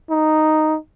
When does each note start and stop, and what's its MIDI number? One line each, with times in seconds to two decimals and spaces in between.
0.10 0.77 63